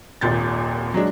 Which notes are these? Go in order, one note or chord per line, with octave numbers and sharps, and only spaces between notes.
D#1 G#1 D#2 A#2 G6 A6
F#3 G#3 D4